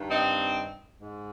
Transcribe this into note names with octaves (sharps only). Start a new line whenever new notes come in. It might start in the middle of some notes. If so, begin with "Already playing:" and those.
Already playing: G2 D#3
C4 D#4
G#2